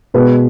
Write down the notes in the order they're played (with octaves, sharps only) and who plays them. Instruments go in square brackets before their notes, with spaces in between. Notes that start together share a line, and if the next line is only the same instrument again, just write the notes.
[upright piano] B2 G#3 B3 B4